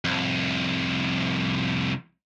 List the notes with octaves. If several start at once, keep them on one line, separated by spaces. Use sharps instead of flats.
C2 F2